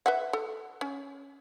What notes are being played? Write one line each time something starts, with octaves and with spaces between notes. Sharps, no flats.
B4 E5 F#5
A4
C#4